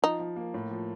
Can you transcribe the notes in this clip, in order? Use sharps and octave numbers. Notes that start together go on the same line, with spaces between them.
F3 D#4
F3
A#3
A2
F3